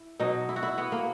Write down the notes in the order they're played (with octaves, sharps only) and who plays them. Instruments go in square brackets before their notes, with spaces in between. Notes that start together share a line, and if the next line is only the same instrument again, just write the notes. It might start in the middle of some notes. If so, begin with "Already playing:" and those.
Already playing: [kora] E4
B2 F#3 D#4
E4
F#4
E4
B3
A#3